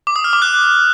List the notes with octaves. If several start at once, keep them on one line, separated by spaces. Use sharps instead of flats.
D6
D#6
F6
D6
F#6